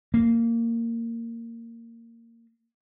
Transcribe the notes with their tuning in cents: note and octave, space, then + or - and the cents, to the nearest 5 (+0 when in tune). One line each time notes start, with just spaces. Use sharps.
A#3 -15